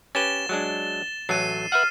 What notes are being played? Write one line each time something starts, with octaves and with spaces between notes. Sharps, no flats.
C#4 G4 B4 A6 E7 G7
F#3 G#3 D4
A1 F#3 A3 C7 D#7
B4 E5 F#5 F6